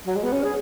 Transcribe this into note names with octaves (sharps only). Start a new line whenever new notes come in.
F#3
G#3
B3
C#4
G#4